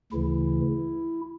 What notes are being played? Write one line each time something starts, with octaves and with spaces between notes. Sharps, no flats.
D2 C#3 E3 E4